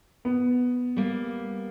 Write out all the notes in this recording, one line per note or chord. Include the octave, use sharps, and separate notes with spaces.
B3
G3 A#3